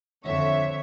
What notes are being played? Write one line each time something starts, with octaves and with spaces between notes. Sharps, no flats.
F2 D3 C#5 E5